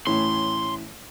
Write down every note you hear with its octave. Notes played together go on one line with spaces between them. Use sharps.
A2 E3 C#4 C6